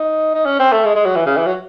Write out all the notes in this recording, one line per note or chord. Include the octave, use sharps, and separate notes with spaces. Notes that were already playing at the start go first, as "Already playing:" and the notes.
Already playing: D#4
D#4
C#4
C4
A3
G#3
G#3
F#3
E3
C#3
E3
F#3